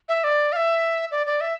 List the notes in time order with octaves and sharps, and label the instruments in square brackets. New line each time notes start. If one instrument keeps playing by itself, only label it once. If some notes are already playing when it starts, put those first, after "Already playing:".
[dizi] E5
D5
F5
E5
D5
D5
E5